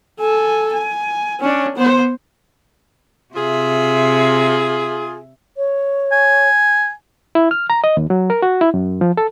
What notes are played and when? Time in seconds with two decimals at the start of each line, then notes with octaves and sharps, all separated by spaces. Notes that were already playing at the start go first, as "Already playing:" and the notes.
0.20 A4 G#5
0.73 G#5
1.40 C#4 D4
1.76 B3 C5
3.34 C3 F4 G#4 E5
5.57 C#5
6.12 G#5
7.35 E4
7.51 F6
7.70 A#5
7.84 D#5
7.97 D#2
8.10 F#3
8.30 A#4
8.42 F#4
8.61 E4
8.74 F#2
9.01 F3
9.17 A4